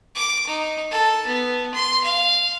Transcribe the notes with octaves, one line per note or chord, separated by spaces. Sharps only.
D6
D#4
A4
B3
C6
F5